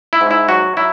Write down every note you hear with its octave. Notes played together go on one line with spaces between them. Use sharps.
E4
G#2
E4
F#3 F#4
F#3 E4